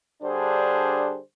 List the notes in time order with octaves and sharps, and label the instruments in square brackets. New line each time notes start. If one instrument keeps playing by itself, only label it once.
[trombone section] D3 G3 D4 G#4 C5